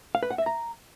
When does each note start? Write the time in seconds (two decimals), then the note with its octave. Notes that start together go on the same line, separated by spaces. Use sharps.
0.15 F5
0.23 B4
0.30 F#5
0.38 E5
0.46 A#5